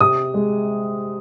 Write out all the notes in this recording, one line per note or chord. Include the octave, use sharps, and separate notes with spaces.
C3 D#6
G#3